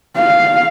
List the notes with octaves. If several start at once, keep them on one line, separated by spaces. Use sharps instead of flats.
F5